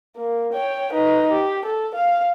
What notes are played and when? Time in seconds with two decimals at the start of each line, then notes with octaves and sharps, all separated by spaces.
0.17 A#3
0.53 C#5 G5
0.92 D#4 B4
1.31 G4
1.66 A4
1.95 F5